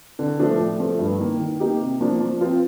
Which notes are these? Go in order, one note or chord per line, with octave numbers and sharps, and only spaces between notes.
D3
F3 A3 D4
A2
F3 A3
G2
D#3 A#3
D#3
A#3 D#4 G4
C3
F3 A#3 D4
F3
C4 F4